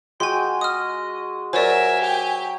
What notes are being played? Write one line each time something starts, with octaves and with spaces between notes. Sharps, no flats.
G#3 F#4 G5 G#5 C6
D#5 D#6 F6
F#3 F#4 A#4 C5 D5 E5 G#5
G4 G5